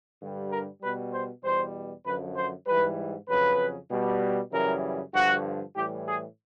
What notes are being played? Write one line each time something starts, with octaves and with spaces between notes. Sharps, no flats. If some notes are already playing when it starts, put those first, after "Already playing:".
G2 D3 G3
A#4
B2 G3 B4
C5
E2 B2 G3 C5
F#2 D3 F3 B4
C5
G#2 E3 G3 B4
F2 C#3 F#3 B4
B2 G3
F#2 C#3 E3 G3 A#4
G2 D3 F3 F#4
A2 E3 G3 G4
G#4